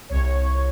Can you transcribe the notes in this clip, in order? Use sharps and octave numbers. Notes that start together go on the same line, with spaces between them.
C2 C#5